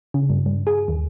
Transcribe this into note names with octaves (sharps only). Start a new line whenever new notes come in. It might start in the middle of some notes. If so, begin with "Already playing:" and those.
C#3
G2
G2
G#4
D#2